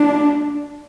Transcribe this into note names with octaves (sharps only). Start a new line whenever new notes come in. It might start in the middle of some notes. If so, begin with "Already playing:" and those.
Already playing: D4